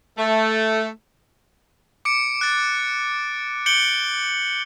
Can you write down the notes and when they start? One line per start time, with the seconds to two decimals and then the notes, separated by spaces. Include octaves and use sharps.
0.18 A3
2.05 D6 C#7 D7
2.41 F#6 A6
3.66 G6 C#7 D7 F#7 G7